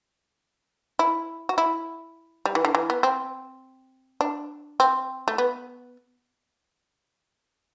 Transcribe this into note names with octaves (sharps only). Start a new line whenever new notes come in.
E4
F#4
E4
G3
E3
D3
E3
B3
C4
D4
C4
A3
B3